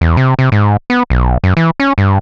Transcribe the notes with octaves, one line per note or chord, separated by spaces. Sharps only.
E2
C3
C3
G#2
B3
B1
F#2
E3
C#4
G2